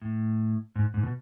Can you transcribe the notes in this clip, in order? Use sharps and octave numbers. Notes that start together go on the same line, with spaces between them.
A2
G#2
G#2
B2